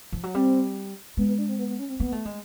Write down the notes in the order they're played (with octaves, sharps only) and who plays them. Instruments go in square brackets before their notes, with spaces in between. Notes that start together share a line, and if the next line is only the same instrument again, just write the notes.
[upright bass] F3
F#3
[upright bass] G3 [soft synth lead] C4
[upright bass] G#3 [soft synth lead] B3
[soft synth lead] B3
D4
C4
B3
B3
C#4
C4
[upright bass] A#3 [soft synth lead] B3
[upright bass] A3
G#3